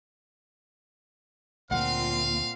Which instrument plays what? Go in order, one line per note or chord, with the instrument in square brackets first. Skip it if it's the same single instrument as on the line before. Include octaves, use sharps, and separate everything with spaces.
[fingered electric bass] D2 G3 A#3 [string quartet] A#2 C4 F4 [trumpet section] F5 [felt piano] F#5